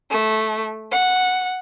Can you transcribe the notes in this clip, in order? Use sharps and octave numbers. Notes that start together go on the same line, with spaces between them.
A3
F#5